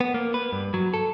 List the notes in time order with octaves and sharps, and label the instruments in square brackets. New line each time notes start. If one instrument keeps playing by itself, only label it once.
[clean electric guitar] B3
A#3
B4
G2
F#3
A4